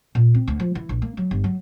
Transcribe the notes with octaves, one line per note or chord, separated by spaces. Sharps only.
A#2
C4
D2
F3
E3
A#1
A#3
F#3
G1
F#3